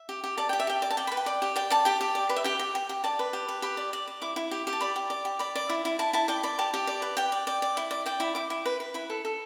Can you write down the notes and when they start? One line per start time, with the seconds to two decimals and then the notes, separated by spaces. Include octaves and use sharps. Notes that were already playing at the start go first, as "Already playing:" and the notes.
Already playing: E5
0.09 G4
0.24 G4
0.38 D5 A5
0.49 G4 G5
0.60 E5
0.67 G4 G5
0.82 D5
0.90 A5
0.97 D5 G5
1.07 B4 B5
1.17 G5
1.26 D5
1.42 G4
1.56 D5 G5
1.70 D5 A5
1.85 G4 G5
2.01 G4
2.15 D5
2.29 B4
2.36 E5
2.44 G4 G5
2.59 G4
2.75 G4
2.89 G4
3.04 D5 A5
3.19 B4
3.33 G4
3.48 B4
3.62 G4 B5
3.77 D5
3.93 D5
4.07 D5
4.22 E4 D6
4.36 E4
4.51 G4
4.67 G4
4.73 A5
4.81 D5 B5
4.96 G4
5.10 D5
5.25 G4
5.39 D5 B5
5.55 D5
5.69 E4
5.85 E4
5.99 E4 A5
6.13 E4 A5
6.28 D5 G5
6.43 D5 B5
6.59 G4 A5
6.74 G4
6.87 D5
7.02 B4
7.17 G4 G5
7.32 D5
7.47 D5
7.62 D5
7.77 E4
7.91 D5
8.06 D5 G5
8.20 E4 B5
8.35 E4 D6
8.50 E4
8.65 B4
8.80 B4
8.94 E4 B5
9.10 A4
9.25 A4